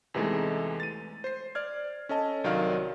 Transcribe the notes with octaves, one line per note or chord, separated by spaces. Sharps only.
E2 C3 E3 G#3 A3 D#4
A6 D#7
C5 C7
D5 F6 G#6
C#4 A4 D#5 A5
C2 D#3 F#3 D5 F5 F6